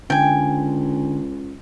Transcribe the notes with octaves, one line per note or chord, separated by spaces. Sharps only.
C#2 D3 G5 G#5